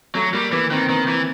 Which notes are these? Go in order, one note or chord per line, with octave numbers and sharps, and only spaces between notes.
F#3 A3
G3 A#3
E3 B3
D#3 C4
C4
D#3 B3
E3